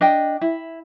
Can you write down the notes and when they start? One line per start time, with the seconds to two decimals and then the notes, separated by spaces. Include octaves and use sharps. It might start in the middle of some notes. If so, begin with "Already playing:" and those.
0.01 D4 D#5 G5
0.41 E4